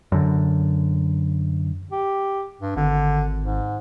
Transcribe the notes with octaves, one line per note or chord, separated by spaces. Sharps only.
F#2 D3
G4
G2
G#1 D3
G#2